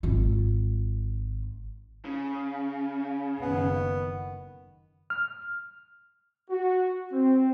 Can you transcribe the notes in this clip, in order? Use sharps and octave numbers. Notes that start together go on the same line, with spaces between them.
G#1 F4
C#3
F#1 D#3 B3
F6
F#4
C4